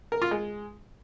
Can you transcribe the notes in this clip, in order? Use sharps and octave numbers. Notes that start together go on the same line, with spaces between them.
A#4
F4
G#3